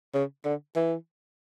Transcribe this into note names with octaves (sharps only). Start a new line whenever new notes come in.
C#3
D3
E3